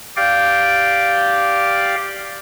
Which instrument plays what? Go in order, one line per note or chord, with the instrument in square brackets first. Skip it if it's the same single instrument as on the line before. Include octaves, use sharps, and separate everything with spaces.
[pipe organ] G4 D5 F5 G5